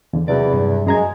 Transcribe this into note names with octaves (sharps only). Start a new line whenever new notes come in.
E2 D3
E2 C3 F#3 D5
G2
F#2 G#3 A#5 G#6